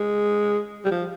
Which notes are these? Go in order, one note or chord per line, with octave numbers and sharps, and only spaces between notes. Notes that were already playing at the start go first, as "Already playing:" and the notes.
Already playing: G#3
G3
F3